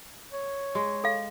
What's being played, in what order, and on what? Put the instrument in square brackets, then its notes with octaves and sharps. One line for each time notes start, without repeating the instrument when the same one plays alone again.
[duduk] C#5
[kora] G#3
[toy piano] A4 F5